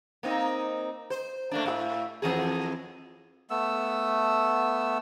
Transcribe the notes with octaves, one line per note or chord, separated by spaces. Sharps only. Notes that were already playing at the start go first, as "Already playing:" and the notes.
A#3 C4 D#4
C5
A3 A#3 D4
A2 F#4 E5
F2 E3 G#4
A3 B3 E6